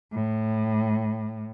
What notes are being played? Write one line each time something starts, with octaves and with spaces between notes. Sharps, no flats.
A2